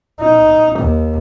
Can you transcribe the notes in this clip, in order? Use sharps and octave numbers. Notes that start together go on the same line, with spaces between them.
D#4
D#2